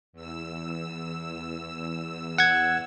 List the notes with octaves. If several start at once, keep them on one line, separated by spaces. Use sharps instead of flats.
E2 E6
F#5 G#6